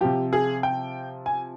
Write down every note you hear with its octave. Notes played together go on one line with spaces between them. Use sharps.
C3 F3 G4
G#4
G5
G#5